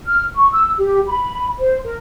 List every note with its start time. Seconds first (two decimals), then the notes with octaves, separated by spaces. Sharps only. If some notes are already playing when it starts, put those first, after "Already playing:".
0.06 F6
0.35 C#6
0.52 E6
0.79 G4
1.07 B5
1.58 C5
1.84 A#4